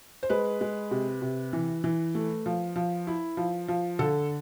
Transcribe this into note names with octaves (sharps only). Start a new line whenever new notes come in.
C5
G#3 B4
G#3
C3
C3
E3
E3
A3
F3
F3
E4
F3
F3
D3 A4